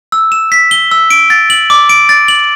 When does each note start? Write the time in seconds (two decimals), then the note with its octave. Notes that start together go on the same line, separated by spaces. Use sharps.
0.12 E6
0.32 E7
0.52 B6
0.71 G7
0.91 E6
1.10 D7
1.30 A6
1.50 F#7
1.70 D6
1.89 D7
2.09 A6
2.28 F#7